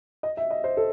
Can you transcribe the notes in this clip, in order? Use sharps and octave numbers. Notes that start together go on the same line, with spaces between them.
D#5
E5
D#5
C5
A4